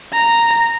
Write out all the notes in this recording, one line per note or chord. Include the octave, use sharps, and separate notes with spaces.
A#5